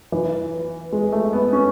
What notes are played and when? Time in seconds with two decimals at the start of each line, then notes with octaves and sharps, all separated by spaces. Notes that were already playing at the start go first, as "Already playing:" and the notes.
0.12 E3
0.92 G#3
1.12 A3
1.33 B3
1.53 C#4